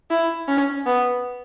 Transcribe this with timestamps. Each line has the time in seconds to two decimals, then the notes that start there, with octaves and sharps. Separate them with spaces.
0.11 E4
0.48 C#4
0.86 B3